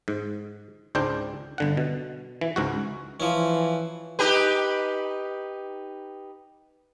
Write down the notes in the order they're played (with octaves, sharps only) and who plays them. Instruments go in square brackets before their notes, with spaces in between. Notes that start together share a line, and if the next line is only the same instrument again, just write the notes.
[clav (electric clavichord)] G#2
C#2 G#2 D4 C5 G5
G1 D3 F#5
B2
E3
C#2 G#2 F#4
[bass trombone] E3 [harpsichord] F3 C#4
[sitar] D#4 G4 B4